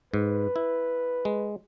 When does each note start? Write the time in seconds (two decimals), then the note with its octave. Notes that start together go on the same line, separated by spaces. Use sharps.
0.14 G#2 B4
0.56 E4
1.25 G#3